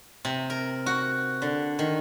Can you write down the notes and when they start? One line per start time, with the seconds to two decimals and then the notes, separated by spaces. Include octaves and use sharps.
0.25 C3
0.50 A#4
0.86 F#4
1.42 D3
1.79 D#3